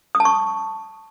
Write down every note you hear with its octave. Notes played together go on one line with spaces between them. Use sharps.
D#6
A5
C#6